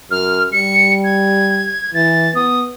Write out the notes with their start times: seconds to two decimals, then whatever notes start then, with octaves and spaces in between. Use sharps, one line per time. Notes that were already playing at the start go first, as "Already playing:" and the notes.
0.11 F#2 F6
0.52 G3 C#7
1.04 G#6
1.94 E3 A6
2.35 B3 D#6